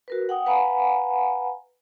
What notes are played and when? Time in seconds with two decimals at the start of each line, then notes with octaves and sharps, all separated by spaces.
0.08 F#4 A#4 B4
0.29 F#5 G5 D#6
0.46 B4 F5 F#5 G#5 A#5 B5